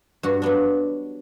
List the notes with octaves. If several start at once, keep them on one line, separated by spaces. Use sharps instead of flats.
G2 F#4
F#3 B3 D4